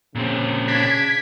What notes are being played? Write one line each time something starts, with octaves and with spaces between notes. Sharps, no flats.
A#2 C#3 C4
D4 G#6 B6